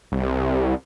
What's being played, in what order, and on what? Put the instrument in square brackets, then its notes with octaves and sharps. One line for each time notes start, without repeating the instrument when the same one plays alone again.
[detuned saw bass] C2